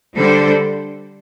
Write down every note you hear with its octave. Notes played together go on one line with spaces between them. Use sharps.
D3 G3 D4 A4 C5